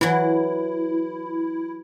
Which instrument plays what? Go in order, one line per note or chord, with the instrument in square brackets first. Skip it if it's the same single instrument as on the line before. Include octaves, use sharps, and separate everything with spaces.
[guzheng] E3 F#3 [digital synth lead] E4